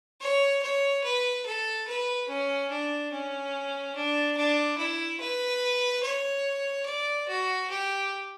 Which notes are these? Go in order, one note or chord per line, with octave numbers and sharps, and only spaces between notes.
C#5
C#5
B4
A4
B4
C#4
D4
C#4
D4
D4
E4
B4
C#5
D5
F#4
G4